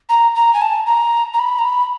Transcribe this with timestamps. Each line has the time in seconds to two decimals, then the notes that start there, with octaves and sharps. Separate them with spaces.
0.09 A#5
0.35 A#5
0.54 G#5
0.61 A5
0.86 A#5
1.34 A#5
1.39 B5
1.59 A#5
1.65 B5